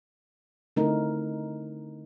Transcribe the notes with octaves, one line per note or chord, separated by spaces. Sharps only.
D3 A3 C4 D#4 E4 A#4